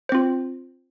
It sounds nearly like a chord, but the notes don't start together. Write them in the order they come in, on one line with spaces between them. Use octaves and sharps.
C5 C4 F4